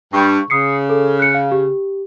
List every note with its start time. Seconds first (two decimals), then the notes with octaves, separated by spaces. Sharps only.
0.13 G2 C#6
0.50 C#3 D#6 C7 C#7
0.89 A4
1.19 F#6 C#7
1.34 F5
1.52 G4